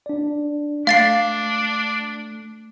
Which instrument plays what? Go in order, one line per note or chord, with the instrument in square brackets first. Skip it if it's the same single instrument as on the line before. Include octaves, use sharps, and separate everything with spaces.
[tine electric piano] D4 D5
[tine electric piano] A3 [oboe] D4 [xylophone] F5 A6 C7